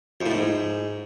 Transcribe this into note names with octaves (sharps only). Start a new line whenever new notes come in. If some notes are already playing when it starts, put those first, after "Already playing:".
F2
A2
G#2